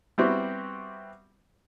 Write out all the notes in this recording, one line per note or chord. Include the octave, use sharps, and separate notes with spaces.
G3 B3 C4 E4 F#4 G4